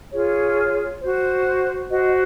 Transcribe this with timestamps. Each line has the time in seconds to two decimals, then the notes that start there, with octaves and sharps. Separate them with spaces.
0.12 F4 G#4 C#5
1.01 F#4 C5
1.90 F#4 C5 D#5